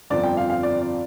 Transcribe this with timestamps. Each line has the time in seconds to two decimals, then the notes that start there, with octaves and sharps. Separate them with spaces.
0.10 G1 F2 F3 C4 D5
0.23 G5
0.37 F5
0.50 F5
0.63 D5
0.82 D5